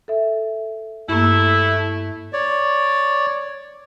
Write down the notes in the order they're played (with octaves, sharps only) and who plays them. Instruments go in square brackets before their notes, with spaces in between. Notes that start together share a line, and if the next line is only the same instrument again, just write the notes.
[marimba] A4 E5
[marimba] G2 A#3 [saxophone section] A3 E4
[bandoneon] C#5 D5